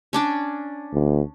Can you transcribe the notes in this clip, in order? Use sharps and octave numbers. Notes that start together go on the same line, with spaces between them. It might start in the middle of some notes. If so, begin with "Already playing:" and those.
C#4 D4 D5
D2